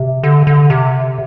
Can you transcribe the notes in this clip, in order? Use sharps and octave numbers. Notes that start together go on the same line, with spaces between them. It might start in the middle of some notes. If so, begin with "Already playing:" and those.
Already playing: C3
D3
D3
C3